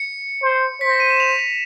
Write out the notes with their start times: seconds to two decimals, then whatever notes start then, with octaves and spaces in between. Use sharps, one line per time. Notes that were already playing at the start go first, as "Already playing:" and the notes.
Already playing: C#7
0.42 C5
0.80 C5 B6
0.90 A#6
1.00 D#7
1.10 E7
1.20 F7
1.39 F7